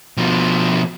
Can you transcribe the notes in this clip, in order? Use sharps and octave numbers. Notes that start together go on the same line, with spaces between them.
B2 F3